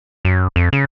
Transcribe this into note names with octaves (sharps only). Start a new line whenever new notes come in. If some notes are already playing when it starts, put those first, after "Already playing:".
F#2
F2
C#3